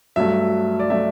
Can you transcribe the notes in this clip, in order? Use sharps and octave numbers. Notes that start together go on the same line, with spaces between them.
G2 F#3 A3 E5
D5
F#3 A3 E5